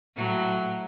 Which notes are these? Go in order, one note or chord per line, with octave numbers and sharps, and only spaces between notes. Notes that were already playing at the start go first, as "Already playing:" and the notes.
A2 F#3